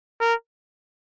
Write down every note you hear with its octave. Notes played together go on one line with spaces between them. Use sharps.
A#4